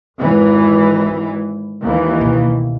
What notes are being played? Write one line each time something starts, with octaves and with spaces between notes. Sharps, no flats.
G#1 F2 E3
G#3
D#2 E3
C#2 B2